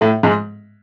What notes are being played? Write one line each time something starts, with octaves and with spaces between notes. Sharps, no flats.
A2 A3
G#2 G#3